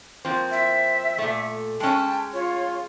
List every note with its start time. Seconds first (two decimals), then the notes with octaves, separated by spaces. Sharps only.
0.25 F3 A#3 C4
0.51 E5
1.18 A#2 A3
1.80 G#3 C#4 G5 A5
2.34 F4 C#5